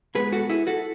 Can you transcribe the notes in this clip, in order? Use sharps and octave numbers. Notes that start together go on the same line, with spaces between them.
B2 G#3 B3 G#4 B4
F#4 A4
E4 G#4
F#4 A4